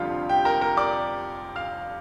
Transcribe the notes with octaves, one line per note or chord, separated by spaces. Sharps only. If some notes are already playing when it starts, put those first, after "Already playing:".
Already playing: F1 F2 D3 G3 F4 F5
G4 G5
A#4 A#5
A#4 A#5
D5 D6
F5 F6